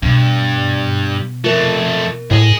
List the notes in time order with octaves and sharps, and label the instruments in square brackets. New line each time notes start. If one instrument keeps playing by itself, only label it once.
[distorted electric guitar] G2 [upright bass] B2
[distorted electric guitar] F2 A3 [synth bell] F4 A#4
[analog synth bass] A2 [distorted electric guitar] G#4 D#5